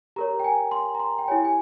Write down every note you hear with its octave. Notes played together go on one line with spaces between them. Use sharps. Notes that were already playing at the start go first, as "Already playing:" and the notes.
G4 A#4 C#5 A#5
G5
G#5
C6
A#5
C6
G5
E4 G4 C#5 G#5
G#5